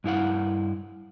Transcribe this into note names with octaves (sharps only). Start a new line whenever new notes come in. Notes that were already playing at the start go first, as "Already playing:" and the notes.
G2 E4 F5 F#5